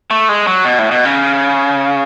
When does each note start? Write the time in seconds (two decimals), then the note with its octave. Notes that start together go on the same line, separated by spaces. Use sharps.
0.11 A3
0.29 G#3
0.47 F#3
0.65 B2
0.79 A2
0.91 B2
1.05 C#3